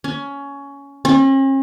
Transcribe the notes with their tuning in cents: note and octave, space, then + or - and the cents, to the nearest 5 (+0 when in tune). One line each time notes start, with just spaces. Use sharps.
C#4 +15
C#4 -45